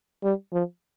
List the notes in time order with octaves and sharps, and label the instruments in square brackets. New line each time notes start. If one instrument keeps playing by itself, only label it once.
[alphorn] G3
F3